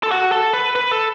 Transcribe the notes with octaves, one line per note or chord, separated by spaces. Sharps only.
A4
F#4
A4
B4
B4
A4